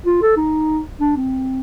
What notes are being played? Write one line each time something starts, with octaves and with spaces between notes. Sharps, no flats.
F4
A4
D#4
D4
C4